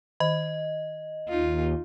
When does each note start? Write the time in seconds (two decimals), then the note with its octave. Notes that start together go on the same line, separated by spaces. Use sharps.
0.20 D#3 D#5
1.29 D#2 D#4 F4